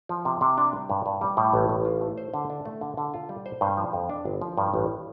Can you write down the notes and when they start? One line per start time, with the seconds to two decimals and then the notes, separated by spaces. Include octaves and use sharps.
0.09 F3
0.25 C3
0.41 C3
0.58 D4
0.73 G3
0.90 G2
1.06 G2
1.21 G3
1.37 A2
1.54 A1
1.69 A1
1.85 F4
2.01 A3
2.18 C5
2.34 D3
2.50 D4
2.65 A3
2.81 D3
2.97 D3
3.14 F4
3.29 G3
3.46 C5
3.61 G2
3.77 F3
3.93 F2
4.09 D4
4.25 G1
4.41 F3
4.57 G2
4.74 A1